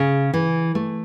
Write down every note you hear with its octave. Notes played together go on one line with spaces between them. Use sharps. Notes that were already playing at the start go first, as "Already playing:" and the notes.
Already playing: C#3
E3
A3